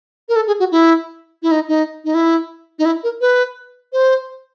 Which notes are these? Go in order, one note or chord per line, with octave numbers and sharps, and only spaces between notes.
A#4
A4
G#4
F#4
E4
E4
D#4
D#4
D#4
E4
D#4
E4
A#4
B4
C5